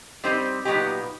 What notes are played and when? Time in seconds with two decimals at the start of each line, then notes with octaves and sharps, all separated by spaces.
0.24 G3 C4 D#4 G4 C5
0.65 A#2 F#3 B3 D#4 G4